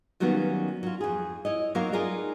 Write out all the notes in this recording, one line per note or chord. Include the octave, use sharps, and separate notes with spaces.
D#3 F#3 G3 A#3 B3 C#4
F#3 F4
F2 G#4
E4 C#5 D#5
F#3 A#3 C4 D#4 A#4 F5
D#4 F4 G#4 A#4 D5